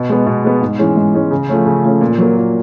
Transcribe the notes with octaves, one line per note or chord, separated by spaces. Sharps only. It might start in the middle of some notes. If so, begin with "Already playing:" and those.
Already playing: B2
G#3 B3
B2
G#3 B3
G#2
E3 G#3 C#4
G#2
E3 G#3 C#4
C#3
F3 A3 C#4
C#3
F3 A3 C#4
A#2
F#3 A#3
A#2